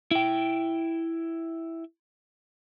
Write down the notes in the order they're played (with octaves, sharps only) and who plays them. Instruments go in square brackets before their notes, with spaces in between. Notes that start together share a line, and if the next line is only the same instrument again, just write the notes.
[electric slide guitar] E4 G5